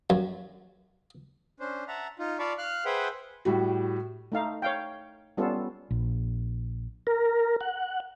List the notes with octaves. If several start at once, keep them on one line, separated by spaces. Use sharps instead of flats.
F#2
C#4 D4 C5
E5 F#5 A5 A#5
D#4 F4
F4 D5 F5 A5 B5 C#6
F5 F6 F#6
G#4 B4 C5 E5 F#5 G5
A2 G3 F#4
A3 D#4 F5
C#5 F5 G5
G3 B3 C#4 F4 A4
A#1
A#4
F#5